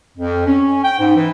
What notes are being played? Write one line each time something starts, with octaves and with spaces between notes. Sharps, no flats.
F2
C#4
G5
G#2
E3